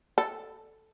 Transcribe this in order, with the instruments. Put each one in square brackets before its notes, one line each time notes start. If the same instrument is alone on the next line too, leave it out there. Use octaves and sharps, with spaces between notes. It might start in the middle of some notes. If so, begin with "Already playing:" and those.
[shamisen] A4